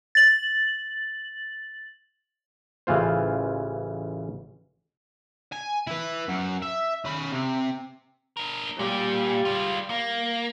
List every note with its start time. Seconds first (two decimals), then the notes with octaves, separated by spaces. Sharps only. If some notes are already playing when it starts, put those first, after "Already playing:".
0.15 A6 F#7
2.87 A1 C#3 E3 F4 C5
5.52 G#5
5.87 E4 B4
6.28 F#2
6.62 E5
7.05 C#4 B5
7.32 C3
8.37 D4 A#4
8.79 A#2 G3
9.45 G#3 F4
9.90 A#3